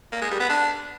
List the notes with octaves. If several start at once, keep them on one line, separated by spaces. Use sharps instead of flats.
A#3
G#3
G3
B3
D4